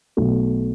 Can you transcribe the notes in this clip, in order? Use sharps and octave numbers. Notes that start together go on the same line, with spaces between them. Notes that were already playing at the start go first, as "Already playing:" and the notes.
B1 B2 A3